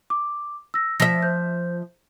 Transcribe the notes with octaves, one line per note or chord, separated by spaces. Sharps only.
D6
E6 A#6
F3 E5 A#6
C5 G6